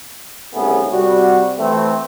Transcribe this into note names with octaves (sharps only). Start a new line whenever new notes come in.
C2 G#2 C#3 A3 B3 G#4
C3 G3 F#4
E3 A3 C4